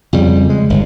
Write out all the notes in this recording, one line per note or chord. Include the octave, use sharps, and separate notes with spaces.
F2 C#3 G3
G#3
G1